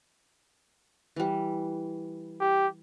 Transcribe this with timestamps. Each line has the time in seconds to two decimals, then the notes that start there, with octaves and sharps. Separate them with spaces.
1.16 E3 G3
2.41 G4